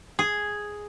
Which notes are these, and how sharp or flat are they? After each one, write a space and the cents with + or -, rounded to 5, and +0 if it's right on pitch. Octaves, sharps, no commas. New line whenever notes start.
G#4 +0